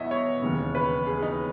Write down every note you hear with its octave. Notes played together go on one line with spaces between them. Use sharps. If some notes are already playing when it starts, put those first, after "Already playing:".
Already playing: E2 B2 G#3 C#5 D#5 E5
C#5
E1 D#2 C#3
B4
G#4
D#4